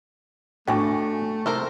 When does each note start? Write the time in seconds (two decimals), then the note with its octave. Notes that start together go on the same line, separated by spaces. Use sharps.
0.68 A2 A3 B3 D4 F#4 G#5
1.46 C3 A4 A#4 C5